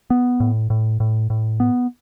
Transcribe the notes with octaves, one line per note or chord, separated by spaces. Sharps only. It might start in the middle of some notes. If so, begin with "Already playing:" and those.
B3
A2
A2
A2
A2
B3